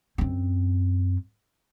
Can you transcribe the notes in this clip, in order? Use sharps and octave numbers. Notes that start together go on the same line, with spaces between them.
F#2 C4